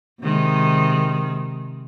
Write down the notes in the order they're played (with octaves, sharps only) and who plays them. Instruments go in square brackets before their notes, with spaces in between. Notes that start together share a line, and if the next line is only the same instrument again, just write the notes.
[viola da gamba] C3 D#3 G#3